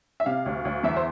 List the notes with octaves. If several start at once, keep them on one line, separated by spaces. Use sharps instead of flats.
E5
C3 F5
D2
D2
E2 E5
C5